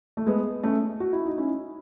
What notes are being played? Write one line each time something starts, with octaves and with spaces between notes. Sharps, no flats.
A3
G#3 B3
A3 C#4
F#4
E4
D#4
C#4 E4